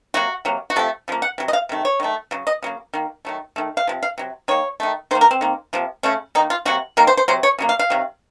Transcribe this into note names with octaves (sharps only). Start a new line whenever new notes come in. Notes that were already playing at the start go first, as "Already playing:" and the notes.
C3 F#3 A#3 F#4
C3 F#3 A#3
F#4
C3 F3 A3 A4
C#3 F3 A#3
F#5
C3 F#3
D#5
F5
C3 D#3 A3
C#5
D#3 F#3 A3
C#3 F#3
D#5
C#3 F#3 A#3
D#3 A#3
D#3 F#3 A3
D#3 A3
F5
C3 F3
F5
C3 F#3
D#3 A#3 C#5
D#3 A3
D#3 A#3 C5
A#4
C4
D#3 A#3
C3 F3 A#3
C#3 A3 C#4
D#3 A#3 D#4
F4
C3 F#3 A#3 F#4
D#3 F#3 A#3 A#4
C5
C5
C3 F#3 C5
C#5
C#3 F#3 A#3
F5
F5
C3 D#3 F#3